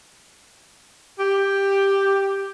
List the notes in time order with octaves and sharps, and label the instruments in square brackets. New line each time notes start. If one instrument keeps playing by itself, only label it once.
[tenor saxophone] G4